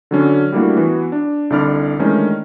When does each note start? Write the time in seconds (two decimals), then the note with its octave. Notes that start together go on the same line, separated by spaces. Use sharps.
0.11 D3 F#3 C#4 D4
0.52 G3 A3 A#3 D4 E4 F#4
0.76 E3 B3 F#4
1.12 D4
1.50 C2 D3 D#4 D5 B5 F6
1.99 D#3 E3 G#3 A3 C#4 D4